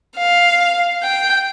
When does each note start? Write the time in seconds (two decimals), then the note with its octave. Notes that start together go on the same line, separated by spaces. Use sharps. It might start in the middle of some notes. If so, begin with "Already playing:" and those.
0.17 F5
1.03 G5